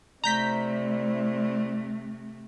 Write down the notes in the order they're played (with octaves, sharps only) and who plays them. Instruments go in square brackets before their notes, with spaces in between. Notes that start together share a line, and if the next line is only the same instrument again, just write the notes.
[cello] C3 A3 [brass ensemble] E4 C5 D5 [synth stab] A#5 G6 B6